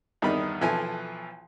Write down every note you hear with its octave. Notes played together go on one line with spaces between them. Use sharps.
E2 G2 D#3 G3 D#4 B5
B1 E3 F3 E4 A4 G#5